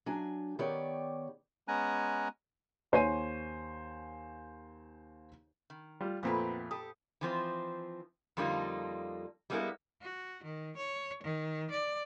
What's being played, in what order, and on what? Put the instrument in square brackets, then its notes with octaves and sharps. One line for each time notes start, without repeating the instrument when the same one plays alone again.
[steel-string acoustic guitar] F#3 D4 G#5
D#3 B3 G4 C#5 D5
[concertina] G#3 B3 C#4 G#5 A#5 F#6
[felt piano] D#2 C5 C#5 G#5 D#7
[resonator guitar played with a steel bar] D#3
[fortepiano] G3 F4
[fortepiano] F2 A#2 A3 [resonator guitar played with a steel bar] B3 C4 B4
[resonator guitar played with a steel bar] G4 A4 [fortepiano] D#6
[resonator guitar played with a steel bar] E3 F3 C4
F2 D3 G3 A#3 D#4 F4
G3 G#3 A#3 B3 E4 A#4
[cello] F#4
D#3
C#5
D#3
D5